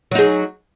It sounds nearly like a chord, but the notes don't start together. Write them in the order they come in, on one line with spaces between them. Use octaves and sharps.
F#3 D#4 G#4